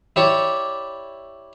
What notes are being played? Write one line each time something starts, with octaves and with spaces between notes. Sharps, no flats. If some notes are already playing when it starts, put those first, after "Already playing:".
E4 G4 C#5 D5